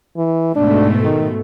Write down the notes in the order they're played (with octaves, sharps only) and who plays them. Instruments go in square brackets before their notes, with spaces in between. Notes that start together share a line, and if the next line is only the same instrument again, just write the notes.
[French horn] E3
[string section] G#2 B2 A3 [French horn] D4
[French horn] D#3